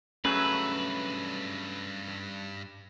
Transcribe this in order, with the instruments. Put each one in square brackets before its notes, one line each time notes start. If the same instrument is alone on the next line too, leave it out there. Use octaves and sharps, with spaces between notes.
[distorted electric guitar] G2 E5 [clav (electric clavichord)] F#3 A3 G#4 [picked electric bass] C#4 [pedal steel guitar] B4